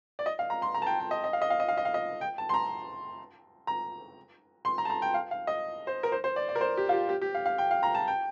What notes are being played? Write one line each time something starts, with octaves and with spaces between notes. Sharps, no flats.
D5
D#5
F5
A#5
C6
A#5
A5
G5
G5
D#5
D#5
F5
D#5
F5
D#5
F5
D#5
F5
D#5
G5
A5
C6
A#5
A#5
C6
A#5
A5
A#5
G5
F5
F5
D#5
C5
A#4
C5
C5
D5
D5
A#4
C5
G4
F4
G4
G4
G4
F5
F5
G5
F5
A#5
A5
G5